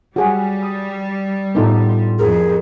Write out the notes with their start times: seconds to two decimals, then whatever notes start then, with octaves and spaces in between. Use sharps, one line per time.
0.16 G3 F#4 G#4 F#5
0.62 D#6
1.55 A2 B3 D#4 F4 G4 A4
1.89 C5
2.19 F2 G#4 A#4